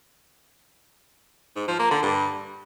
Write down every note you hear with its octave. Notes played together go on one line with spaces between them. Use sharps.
G#2
F3
A#3
D3
G2